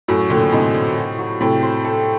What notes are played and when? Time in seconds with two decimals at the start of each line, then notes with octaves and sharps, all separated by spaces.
0.08 F#2 A2 F#4
0.30 A#2 D3 C4
0.52 A2 C3 D#4
0.74 C5
0.96 F#4
1.18 F#3
1.41 A2 C3 C4
1.63 C5
1.85 A4